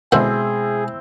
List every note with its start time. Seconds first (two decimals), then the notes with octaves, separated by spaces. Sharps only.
0.12 B2 D3 G#3 C4 E4 G#4 C5 F#5